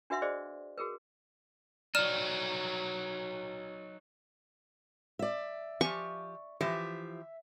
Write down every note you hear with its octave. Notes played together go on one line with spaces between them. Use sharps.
D4 F#4 B4 E5 F#5 C6
G#4 C5 D5 D#5
F#4 G#4 A#4 B4
F#3 D#4 D5 F6 E7
D5 E5
F3 G4 G#5 C#6
E3 F3 G4 E5